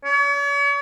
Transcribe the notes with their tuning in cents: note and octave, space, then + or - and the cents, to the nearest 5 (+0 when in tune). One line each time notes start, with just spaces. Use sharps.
C#5 +40